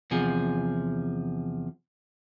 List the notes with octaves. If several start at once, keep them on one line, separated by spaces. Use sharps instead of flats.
E2 C3 F3 G#4